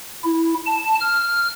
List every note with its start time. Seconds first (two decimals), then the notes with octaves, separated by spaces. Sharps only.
0.24 E4
0.66 A5
1.01 F6